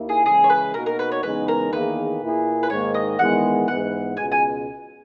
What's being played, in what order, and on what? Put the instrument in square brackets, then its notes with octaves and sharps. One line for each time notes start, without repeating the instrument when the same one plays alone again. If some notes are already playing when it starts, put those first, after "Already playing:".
Already playing: [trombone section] D#2 D#3 A#3 E4
[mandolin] G#4
[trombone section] C#3 E3 G#3 [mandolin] G#4
[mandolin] C#5
B4
[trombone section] B2 A#3 D#4 F#4 [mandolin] A#4
[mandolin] A#4
B4
C#5
[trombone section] E2 C#3 G#3 B3 D#4 [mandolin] B4
[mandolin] A#4
[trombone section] E2 D#3 A#3 E4 G#4 [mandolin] B4
[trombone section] A#2 A#3 E4 G#4
[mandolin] B4
[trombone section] G#2 D#3 A#3 [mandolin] C#5
[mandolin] D#5
[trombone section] E2 D#3 G#3 B3 E4 [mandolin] F#5
[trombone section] G#2 E3 B3 [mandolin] F#5
[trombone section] C#2 B2 G#3 [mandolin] G#5
[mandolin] G#5